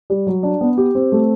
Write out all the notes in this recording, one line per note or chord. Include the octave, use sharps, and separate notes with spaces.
G3
F#3
D4
B3
G4
C4
A3